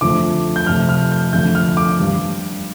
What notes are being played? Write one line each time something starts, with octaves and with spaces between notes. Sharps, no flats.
F2 D3 F3 A3 D6
G6
F2 C3 A3 F6
F6
G6
F2 D3 A3 G6
F6
D6
G2 G3